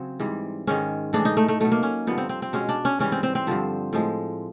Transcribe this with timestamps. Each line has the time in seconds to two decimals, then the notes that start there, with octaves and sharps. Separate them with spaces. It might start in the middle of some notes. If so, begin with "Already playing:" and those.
Already playing: C#3 F#3 C4
0.20 G#2 E3 G3
0.67 G#2 D#3 G#3 C#4
1.13 A2 E3 G#3 D4
1.25 D#4
1.37 A3
1.48 A3
1.60 B2 F#3 A3
1.72 A#3
1.83 C#4
2.07 G2 D3 F3 B3
2.18 C4
2.29 C4
2.42 C4
2.53 B2 G#3 C#4
2.69 D4
2.85 C#4
2.99 G#2 E3 G3 C#4
3.12 C4
3.23 C4
3.35 C4
3.47 G2 D3 F3
3.93 A2 F3 G#3